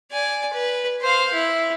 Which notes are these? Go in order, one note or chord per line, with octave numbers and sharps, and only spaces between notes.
D5 G#5
B4
C5 F5
E4